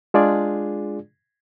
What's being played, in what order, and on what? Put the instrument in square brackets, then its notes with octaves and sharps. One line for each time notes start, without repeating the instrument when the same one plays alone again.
[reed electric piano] G#3 D4 F4 G#4 D5